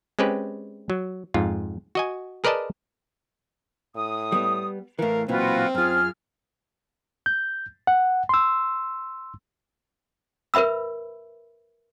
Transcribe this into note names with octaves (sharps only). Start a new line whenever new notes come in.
G#3 C4 C#4 G4 B4
F#3
F2 G#2 F4
F#4 D#5 G#5
G#4 A#4 B4 D5 D#5 A5
A2 D#6
G3 B3
A2 E3 A#4 F5
B1 A#2 E3 C4 F4 F#4 B4
F#2 F4 G#4 F6
G6
F#5
C6 E6
A#4 B4 E5 B5 E6